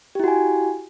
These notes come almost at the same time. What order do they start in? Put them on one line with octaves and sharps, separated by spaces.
G4 E4 F#4 G#5